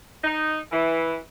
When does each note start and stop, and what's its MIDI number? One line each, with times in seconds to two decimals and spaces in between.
0.23 0.59 63
0.71 1.17 52